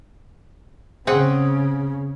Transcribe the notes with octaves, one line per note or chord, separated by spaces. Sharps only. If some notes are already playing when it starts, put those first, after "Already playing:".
C#3 C4 G#4 F#5